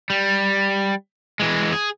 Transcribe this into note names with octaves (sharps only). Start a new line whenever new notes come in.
G3
E3 G#3
G#4